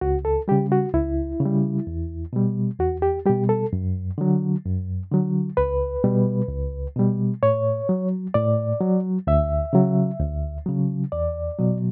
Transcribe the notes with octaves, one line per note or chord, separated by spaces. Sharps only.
C#2 F#4
A4
C#3 G3 G4
F#4
C#2 E4
C#3 G3
E2
B2 G3
E2 F#4
G4
B2 G3 G4
A4
F#2
D3 F#3
F#2
D3 F#3
C#2 B4
B2 G3
C#2
B2 G3
A2 C#5
F#3
A2 D5
F#3
D2 E5
C#3 F#3
D2
C#3 F#3
E2 D5
B2 F#3